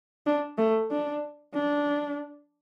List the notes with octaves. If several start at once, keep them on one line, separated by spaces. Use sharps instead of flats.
D4
A3
D4
D4